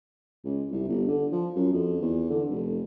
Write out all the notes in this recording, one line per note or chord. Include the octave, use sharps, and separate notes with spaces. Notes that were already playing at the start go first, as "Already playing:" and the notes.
C#2
C2
G1
D3
F3
F#2
F2
E2
D3
F1